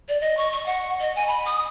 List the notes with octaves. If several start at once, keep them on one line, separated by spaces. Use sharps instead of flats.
D5
D#5
C#6
C#6
F#5
D#5
G#5
B5
D#6